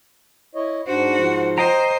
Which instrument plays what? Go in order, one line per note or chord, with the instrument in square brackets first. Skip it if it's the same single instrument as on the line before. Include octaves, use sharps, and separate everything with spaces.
[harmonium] E4 C#5 D#5
[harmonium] G#2 C5 [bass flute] D4 [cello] F#4
[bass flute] F3
[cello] C5 [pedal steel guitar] D#5 G5 A#5